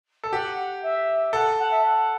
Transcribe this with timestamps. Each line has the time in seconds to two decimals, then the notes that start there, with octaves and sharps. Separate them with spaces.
0.24 A4
0.32 G4 F#5
0.82 E5
1.33 A4 F#5
1.59 F#5
1.71 E5
1.83 F#5